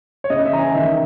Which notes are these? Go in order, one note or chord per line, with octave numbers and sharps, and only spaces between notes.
C#5
C#3 D#5
E5
E3 A#5
G#5
D#3 E5